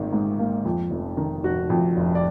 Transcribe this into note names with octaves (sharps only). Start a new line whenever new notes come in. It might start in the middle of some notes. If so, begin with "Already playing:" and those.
Already playing: G#1 G#2 D#3 A#3
G#2
A#3
F2
F1
D#3
F1 F#4
F2
F1
D5